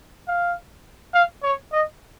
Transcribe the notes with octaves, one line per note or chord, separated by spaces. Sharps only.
F5
F5
C#5
D#5